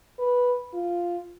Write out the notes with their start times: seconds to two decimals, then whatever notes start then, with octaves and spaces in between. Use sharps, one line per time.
0.19 B4
0.74 F4